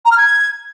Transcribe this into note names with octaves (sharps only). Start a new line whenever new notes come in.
A#5
F6
G#6